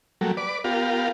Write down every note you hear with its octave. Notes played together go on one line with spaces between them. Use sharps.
F#3 G3 A3 A#3
B4 D5 D6
B3 F4 G4 A#4 F5